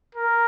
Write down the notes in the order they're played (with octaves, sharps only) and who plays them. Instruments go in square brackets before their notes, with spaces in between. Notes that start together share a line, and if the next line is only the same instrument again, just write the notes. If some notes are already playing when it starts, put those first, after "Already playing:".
[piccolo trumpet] A#4